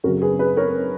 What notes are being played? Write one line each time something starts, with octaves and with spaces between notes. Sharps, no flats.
F#2 C#3 F#3 F#4 A#4
G#4 B4
G#4 B4
A#4 C#5